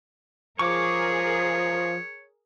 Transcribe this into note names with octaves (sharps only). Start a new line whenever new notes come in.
F3 G#4 A#4 C#5 C#6 D6